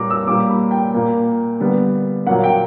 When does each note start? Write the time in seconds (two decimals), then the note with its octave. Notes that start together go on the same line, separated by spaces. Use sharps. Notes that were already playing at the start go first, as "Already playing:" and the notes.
Already playing: A#2 G3 A#3 A#5 D6
0.10 E6
0.27 A#2 G3 A#3 D6
0.50 B5
0.71 G5
0.94 A#2 A#3
1.60 D3 G3 B3
2.27 A#2 F#3 A#3 F#5
2.44 G5